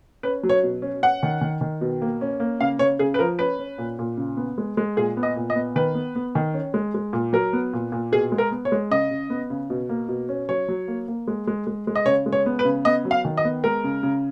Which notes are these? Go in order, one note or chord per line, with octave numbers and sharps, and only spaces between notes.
C#4 B4
F#3
C#5
B2
C#4
C#4 F#5
D#3
D#3
D#3
B2
A#3
C#4
A#3
C#3 F5
C#3 C#5
C#3 G#4
B4
F3 A#4
C#4 B4
C#4
A#2
A#2
C#3
B3
G#3
G#3
A#2 G#4
B3
D#5
A#2
D#5
B3
D#3 B4
B3
B3
D#3
C#4
G#3
G#3
A#2
F#3 A#4
B3
A#2
A#2
B2 G#4
G#3
A#4
B3
C#5
G#3
C#3 D#5
C#3
B3
C#3
B2
A#3
B2
C#4
F#3 C#5
F#3
A#3
A#3
G#3
G#3
G#3
G#3
D#5
C#3 C#5
G#3
C#5
B3
B4
C#3
B3 D#5
F#3
F5
D#3
D#5
B3
G#3 A#4
C#3
C#3